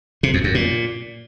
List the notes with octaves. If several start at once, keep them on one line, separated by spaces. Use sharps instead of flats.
C3
F2
F#2
A#2